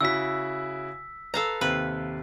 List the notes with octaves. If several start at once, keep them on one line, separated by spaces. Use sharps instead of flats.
C#3 E4 F#4 E6 B6
A4 B4 F5 A#5
D#2 C3 B4